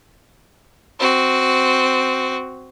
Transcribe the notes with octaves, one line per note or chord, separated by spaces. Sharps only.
C4 F#4